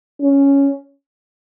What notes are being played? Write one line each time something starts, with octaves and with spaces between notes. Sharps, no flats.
C#4